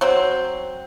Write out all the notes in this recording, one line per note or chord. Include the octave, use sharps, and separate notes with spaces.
F#3 C4